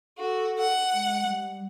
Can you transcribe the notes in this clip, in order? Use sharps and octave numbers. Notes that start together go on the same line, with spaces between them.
F#4 A4
F#5
G#3
G3